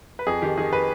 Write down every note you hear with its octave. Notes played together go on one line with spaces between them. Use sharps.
B4
F2 G#4
D#3 G4
D#3 G#4
B4